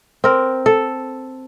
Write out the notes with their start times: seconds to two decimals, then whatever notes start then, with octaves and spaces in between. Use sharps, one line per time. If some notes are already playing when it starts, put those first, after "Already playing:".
0.24 C4 A#4
0.66 A4